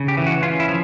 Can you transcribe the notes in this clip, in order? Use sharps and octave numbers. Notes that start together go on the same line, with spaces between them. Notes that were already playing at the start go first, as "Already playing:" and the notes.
Already playing: C#3
G4
E3
F#4
C#4 F4
E4
F3